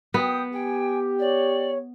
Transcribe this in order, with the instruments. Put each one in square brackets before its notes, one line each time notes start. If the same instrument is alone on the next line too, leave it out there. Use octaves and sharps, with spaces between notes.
[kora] B3 [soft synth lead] G5 [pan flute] D#6
[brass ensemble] G4 [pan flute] G5 [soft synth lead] G#5
[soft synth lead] C#5 [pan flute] D5